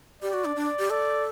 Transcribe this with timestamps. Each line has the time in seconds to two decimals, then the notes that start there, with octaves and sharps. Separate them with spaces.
0.22 G4 D5
0.33 F#4
0.45 D4
0.56 D4
0.79 G4
0.90 A4 D5